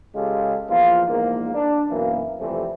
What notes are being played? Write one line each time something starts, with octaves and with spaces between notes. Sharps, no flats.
C#3 G#3 F4 G4 A4
E2 F3 A#3 F4
A#1 E2 G#2 A#3
D4
F#2 B2 E3 A#3
F2 C3 E3 G3 A3 C4